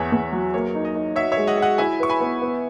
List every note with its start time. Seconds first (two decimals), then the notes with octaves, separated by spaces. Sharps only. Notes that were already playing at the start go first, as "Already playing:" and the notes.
Already playing: E2 C#5 E5 F#5
0.12 E2
0.32 F#3
0.53 A#3 C#5
0.75 D#4
0.85 D#5
0.95 D#4
1.16 F#4 C#5 E5
1.32 C#5 E5
1.37 G#3
1.47 D#5 F#5
1.57 F#4
1.62 D#5 F#5
1.78 E4 E5 G#5
2.00 B4 C#6
2.10 G#5 B5
2.20 B3
2.42 B3